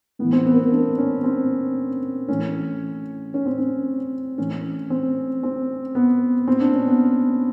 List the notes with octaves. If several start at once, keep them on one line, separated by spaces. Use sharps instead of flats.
A2 E3 B3
C4
B3
A#3
B3
D4
C#4
C4
A2 E3 C#4
C#4
C4
C#4
A2 E3 C#4
C4
C4
B3
A#2 C4
D4
C#4
B3